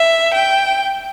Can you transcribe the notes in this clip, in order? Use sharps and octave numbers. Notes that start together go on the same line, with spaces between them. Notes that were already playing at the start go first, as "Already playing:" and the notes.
Already playing: E5
G5